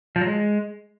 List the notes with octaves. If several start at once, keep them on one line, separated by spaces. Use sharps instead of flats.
F3
F#3
G#3